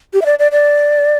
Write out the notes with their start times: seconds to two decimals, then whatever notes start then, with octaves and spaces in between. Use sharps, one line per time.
0.14 G4
0.22 E5
0.26 D5
0.39 D5
0.52 D5